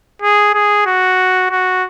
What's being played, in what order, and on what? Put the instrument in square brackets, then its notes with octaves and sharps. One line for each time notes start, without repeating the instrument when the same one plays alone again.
[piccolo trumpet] G#4
G#4
F#4
F#4